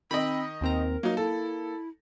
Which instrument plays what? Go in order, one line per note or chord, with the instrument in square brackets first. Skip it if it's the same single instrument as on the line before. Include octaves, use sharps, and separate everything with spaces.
[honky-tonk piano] D#3 D#5 [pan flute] C4 [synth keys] B5
[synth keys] D#2 C4 A#5 [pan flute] A#4
[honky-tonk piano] F#3 D#4 [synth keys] A#3
[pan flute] E4 [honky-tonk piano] A4